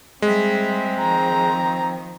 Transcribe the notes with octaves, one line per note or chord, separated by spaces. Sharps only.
G3 G#3 C4 E5
D#3 F3 A#5